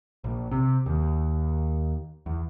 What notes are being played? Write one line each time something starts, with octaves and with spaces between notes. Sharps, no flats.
A#1
C3
D#2
E2